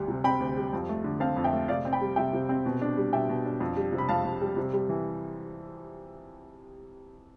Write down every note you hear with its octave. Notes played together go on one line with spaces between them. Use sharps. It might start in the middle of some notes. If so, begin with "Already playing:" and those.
Already playing: D2 G3
C3
C4 G5 B5
D2
G3
F2
A3
D3
C4 F5 A5
F2
E5 G5
A3
C3 D5 F5
C4
G5 B5
G3
C3 E5 G5
C3
C4
B2
D4
G3
B2 E5 G5
B2
D4
F2
G3
C3
B5
F2 F5 A5
F2
G3
C3
G3
E3